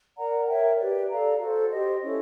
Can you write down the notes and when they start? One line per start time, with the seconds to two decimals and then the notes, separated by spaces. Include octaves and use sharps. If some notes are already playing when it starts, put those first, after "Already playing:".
0.16 A#4 D5 F#5 A#5
0.48 A#4 C#5 E5 G5
0.78 G4 B4 D5
1.10 A4 D5 F5 A#5
1.39 F#4 A4 C5
1.71 G4 C5 D#5
2.02 C#4 E4 A4